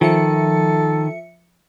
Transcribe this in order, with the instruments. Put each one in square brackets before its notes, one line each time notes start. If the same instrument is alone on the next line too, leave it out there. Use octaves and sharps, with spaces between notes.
[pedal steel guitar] D#3 [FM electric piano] F3 E5 C#7 [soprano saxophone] A4